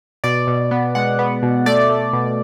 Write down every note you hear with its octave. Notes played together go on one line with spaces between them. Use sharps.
B2 D5
B2
B3
G#3 F#5
B3
B2
A3 D5
A3
B2